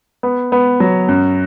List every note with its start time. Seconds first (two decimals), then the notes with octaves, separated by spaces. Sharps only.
0.23 B3
0.52 B3
0.80 F#3
1.08 F#2